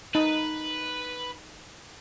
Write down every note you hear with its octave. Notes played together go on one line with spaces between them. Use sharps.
D#4 B4